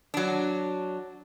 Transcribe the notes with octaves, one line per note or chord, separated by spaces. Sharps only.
F#3 D4